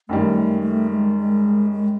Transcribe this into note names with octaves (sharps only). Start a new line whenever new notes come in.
F#2 D#3 G3 A3
A3
G#3
G#3
G#3